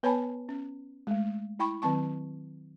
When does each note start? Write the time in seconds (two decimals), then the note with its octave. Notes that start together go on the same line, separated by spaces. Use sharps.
0.03 B3 B4 C#5 G#5 A5 B5
0.49 C#4
1.07 G#3 A3
1.59 E4 G5 B5 C#6
1.82 D#3 F#3 C4 A5 C#6